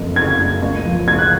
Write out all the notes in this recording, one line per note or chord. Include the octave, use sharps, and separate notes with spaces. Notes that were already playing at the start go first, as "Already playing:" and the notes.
Already playing: F#1 F2
C#3 G#6
F#1
C#2
F3
C#2 G#6
F#6